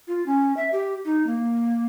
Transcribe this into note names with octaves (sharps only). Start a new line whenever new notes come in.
F4
C#4
E5
G4
D#4
A#3